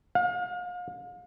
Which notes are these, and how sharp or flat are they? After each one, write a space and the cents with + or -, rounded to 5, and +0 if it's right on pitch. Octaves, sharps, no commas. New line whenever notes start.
F5 +40